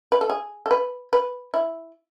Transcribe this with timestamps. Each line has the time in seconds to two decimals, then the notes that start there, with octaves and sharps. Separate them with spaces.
0.12 B4
0.21 A4
0.30 G#4
0.66 A4
0.71 B4
1.13 B4
1.54 E4